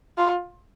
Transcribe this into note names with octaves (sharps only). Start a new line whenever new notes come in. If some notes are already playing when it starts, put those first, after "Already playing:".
F4